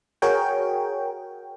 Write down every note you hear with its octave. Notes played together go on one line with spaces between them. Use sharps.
F#4 G#4 A#4 C#5 G5